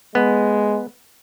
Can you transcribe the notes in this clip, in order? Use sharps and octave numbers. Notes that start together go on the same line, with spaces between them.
G#3 B3